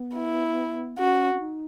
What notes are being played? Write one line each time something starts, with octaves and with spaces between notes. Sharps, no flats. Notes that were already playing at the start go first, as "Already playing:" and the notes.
Already playing: B3
E4
C#4 F#4
C#4
D#4